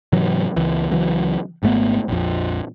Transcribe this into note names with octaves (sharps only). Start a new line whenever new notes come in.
G#2 C3 E3 F#3
C#2 E3
C#2 E3 F#3
G#1 G#2 A3 B3
A#1 F2